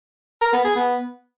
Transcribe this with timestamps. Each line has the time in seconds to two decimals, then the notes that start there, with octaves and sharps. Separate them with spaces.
0.42 A#4
0.53 B3
0.64 G#4
0.76 B3